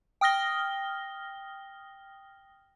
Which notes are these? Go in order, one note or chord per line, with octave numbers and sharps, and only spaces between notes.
G5 D#6 F6 A#6 G7